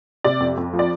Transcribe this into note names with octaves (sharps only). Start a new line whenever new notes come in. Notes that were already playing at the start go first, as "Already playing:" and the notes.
C3 D5
F2
F2
F3
D5